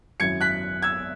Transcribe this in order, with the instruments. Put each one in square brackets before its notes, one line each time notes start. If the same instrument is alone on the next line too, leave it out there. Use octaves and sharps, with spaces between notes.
[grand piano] G#1 F#2 F#3 C#4 E4 [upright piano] G#6 C#7
[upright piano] F#6 B6
E6 G#6